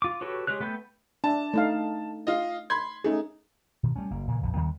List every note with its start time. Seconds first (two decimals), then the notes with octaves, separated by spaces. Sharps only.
0.02 F4 D6
0.21 F#4 G4 A4 B4 C#5
0.47 G#3 G4 C#5 F#6
0.60 A3 B3 A4 B4 G5
1.24 D4 E5 A5
1.54 A3 D#4 F5
2.27 F4 D#5
2.70 B5 C6 G#6
3.04 A3 C#4 D#4 G#4
3.83 B2 D#3
3.96 G3 A3 C#4
4.11 F#1 A#3
4.27 A#2 C#3 E3
4.43 A#1 F2 D3
4.54 D#2 D#3 G3 B3